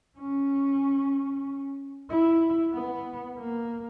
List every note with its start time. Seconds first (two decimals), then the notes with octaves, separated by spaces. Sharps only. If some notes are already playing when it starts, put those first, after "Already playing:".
0.18 C#4
2.10 E4
2.74 B3
3.38 A#3